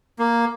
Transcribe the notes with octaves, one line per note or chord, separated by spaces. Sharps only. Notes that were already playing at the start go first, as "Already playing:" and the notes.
A#3